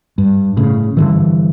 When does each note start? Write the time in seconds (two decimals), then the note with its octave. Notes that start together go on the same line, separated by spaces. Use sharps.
0.18 G2
0.57 A2 C#3
0.97 G2 D3 E3